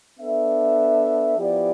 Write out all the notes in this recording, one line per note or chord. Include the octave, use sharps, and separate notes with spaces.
B3 D4 A4 E5
F3 B3 E4 G4 D5